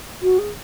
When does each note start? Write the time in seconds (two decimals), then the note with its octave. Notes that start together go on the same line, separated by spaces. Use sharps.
0.22 F#4
0.38 G#4